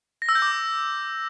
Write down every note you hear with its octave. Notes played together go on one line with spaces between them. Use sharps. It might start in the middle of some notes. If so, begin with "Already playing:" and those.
A#6
E6
G6
D6